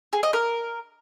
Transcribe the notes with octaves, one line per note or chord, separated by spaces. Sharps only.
G#4
D#5
A#4